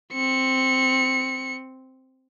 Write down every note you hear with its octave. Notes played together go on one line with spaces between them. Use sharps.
C4 C#7